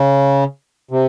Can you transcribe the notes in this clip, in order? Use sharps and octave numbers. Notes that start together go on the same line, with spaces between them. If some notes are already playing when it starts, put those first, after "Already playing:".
Already playing: C#3
C3